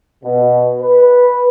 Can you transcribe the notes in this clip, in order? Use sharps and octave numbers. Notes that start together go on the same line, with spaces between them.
B2
B4